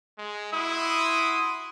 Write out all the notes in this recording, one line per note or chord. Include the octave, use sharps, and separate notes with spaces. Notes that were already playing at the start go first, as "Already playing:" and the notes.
G#3
E4 F#4 C6 D#6